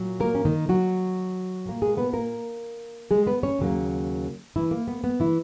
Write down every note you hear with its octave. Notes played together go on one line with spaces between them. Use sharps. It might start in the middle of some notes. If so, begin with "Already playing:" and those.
Already playing: A#2 F#3
A#3 A#4
C#4
D#3 D#4
F#3 F#4
A#2 A#3
G#3 G#4
B3 B4
A#3 A#4
G#3 G#4
B3 B4
C#4 C#5
D#2 C#3 F#3 A#3
E3 E4
A#3
B3
B3
E3 E4